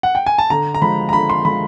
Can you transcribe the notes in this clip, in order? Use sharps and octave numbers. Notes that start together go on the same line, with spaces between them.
F#5
G5
G#5
A5
D3 A#5
A#5
F3 G#3 B5
A#5
D3 B5
C6
F3 G#3 B5